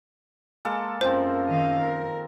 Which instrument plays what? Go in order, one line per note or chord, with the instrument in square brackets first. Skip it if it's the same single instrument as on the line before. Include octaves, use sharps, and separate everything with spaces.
[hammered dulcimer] G#3 A#3 A4
[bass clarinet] F#2 [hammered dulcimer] F3 C4 [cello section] A#4 [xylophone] C5
[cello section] D#3 D#5 F5
A#4